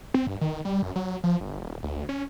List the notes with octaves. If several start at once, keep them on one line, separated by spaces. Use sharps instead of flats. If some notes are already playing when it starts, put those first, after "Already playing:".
C4
G2
D#3
G3
F#2
F#3
F3
G1
D#1
D2
C#4